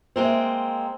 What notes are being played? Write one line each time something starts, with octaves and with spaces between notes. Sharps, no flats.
G#3 A#3 C4